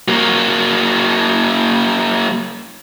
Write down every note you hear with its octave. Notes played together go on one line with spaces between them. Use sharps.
F#3 A#3